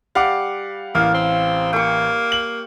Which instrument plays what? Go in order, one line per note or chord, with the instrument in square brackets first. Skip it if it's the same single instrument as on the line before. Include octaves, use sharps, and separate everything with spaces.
[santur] G3 [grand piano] F5 F#5 D6
[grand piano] A1 [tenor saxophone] A#3 [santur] F5
[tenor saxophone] C4
[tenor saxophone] A#3 [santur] G5 C#6
[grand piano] F#7